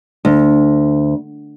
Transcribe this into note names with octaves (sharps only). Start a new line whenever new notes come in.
D2